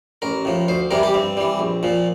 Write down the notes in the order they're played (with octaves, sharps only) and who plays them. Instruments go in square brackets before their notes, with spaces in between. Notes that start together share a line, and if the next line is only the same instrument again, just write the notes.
[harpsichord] A1 A#4
A2 F3
D2 C5
C3 E3 G3 A#4
G4
G2 C4
E3 G3
A#1
A#2 F3